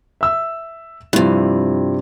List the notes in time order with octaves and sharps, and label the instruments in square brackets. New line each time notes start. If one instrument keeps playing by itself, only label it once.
[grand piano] E5 E6
[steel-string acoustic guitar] G2 C3 [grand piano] F3 E4